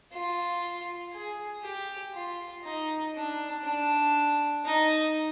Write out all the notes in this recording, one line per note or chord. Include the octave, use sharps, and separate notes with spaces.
F4
G#4
G4
F4
D#4
D4
D4
D#4